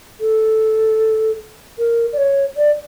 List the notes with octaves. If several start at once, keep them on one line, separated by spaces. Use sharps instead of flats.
A4
A#4
D5
C#5
D5